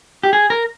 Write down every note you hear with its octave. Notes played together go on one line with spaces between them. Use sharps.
G4
G#4
A#4